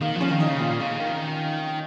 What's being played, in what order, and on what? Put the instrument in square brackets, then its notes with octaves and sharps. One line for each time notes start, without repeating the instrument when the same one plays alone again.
[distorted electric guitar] D#3 [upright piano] A#3
[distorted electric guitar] F3 [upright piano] C#4
[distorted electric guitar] D#3
[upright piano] D#4
[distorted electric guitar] C#3
[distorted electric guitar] A#2 [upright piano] F4
[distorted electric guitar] C#3
D#3